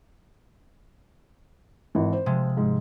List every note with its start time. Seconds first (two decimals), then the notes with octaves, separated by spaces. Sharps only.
1.95 G#1 E3
2.13 C5
2.26 C3 F3 G#3
2.57 G#2